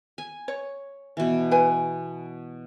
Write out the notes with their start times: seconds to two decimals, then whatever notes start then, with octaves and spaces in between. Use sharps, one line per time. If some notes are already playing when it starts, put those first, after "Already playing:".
0.18 G#5
0.48 C#5
1.17 B2 E3
1.51 B4 G#5